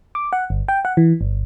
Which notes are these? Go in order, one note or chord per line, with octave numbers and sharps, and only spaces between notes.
D6
F#5
G1
G5
F#5
E3
G1